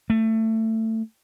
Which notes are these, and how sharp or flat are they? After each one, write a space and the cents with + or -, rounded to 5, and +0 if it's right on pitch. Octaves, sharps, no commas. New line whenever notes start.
A3 +20